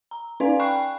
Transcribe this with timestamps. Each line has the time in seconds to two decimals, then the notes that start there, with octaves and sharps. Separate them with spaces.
0.11 A#5
0.40 C#4 D#4 B4 D5 F5 G#5
0.60 G5 B5 C#6 F#6 C7